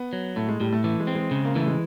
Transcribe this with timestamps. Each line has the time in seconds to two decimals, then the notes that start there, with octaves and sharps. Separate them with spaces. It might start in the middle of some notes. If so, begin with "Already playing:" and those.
Already playing: B3
0.13 F#3
0.36 A2 A3
0.49 G#3
0.60 A2 G3
0.73 A3
0.84 E3 A3
1.00 G#3
1.07 C4
1.15 G#3
1.31 C#3
1.45 A#3
1.55 E3 A3
1.67 G#3